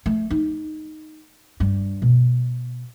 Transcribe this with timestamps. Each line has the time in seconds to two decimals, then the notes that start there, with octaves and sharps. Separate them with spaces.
0.06 A3
0.30 D#4
1.60 G2 G3
2.02 B2